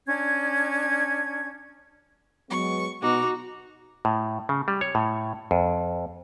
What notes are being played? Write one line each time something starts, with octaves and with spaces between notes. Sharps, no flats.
C#4 D4 G#6
F#3 G#3 B3 C#6
B2 D#4 F#4 D6 F7
A2
C#3
G3
C#5
A2
F2